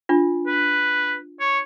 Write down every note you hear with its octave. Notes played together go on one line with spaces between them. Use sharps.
D4 F4
B4
C#5